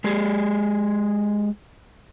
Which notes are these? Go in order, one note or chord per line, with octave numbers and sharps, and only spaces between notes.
G#3 G4 G#4